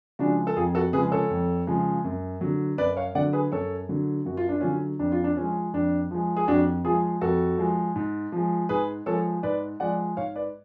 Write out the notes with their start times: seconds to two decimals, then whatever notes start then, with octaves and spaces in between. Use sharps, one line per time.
0.19 C#3 F3 G#3 D4 F#4
0.47 A4
0.56 F2 F4 G#4
0.75 F#4 A4
0.93 C#3 F3 G#3 G#4 B4
1.12 A4 C#5
1.30 F2
1.67 C#3 F3 G#3
2.04 F#2
2.41 D3 F#3
2.78 F#2 B4 D5
2.97 C#5 F5
3.15 D3 F#3 D5 F#5
3.33 G#4 B4
3.52 F#2 A4 C#5
3.89 D3 F#3
4.25 F#2 F#4
4.37 F4
4.49 D4
4.60 D3 F#3 C#4 F4
4.99 F2 D4
5.12 F4
5.24 D4
5.37 F3 G#3 C#4
5.73 F2 D4
6.11 F3 G#3
6.37 G#4
6.48 F2 D4 F#4
6.84 F3 G#3 F4 G#4
7.21 F2 F#4 A4
7.58 F3 G#3
7.96 G#2
8.32 F3 G#3
8.69 G#2 G#4 B4
9.06 F3 G#3 A4 C#5
9.43 G#2 B4 D5
9.80 F3 G#3 D5 F#5
10.17 G#2 C#5 F5
10.35 B4 D5